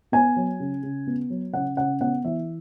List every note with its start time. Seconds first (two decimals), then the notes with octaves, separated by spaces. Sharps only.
0.12 B3 G#5
0.36 F#3
0.60 C#3
0.83 C#3
1.07 B3
1.30 F#3
1.54 C#3 F#5
1.77 C#3 F#5
2.01 B3 F#5
2.25 E3 E5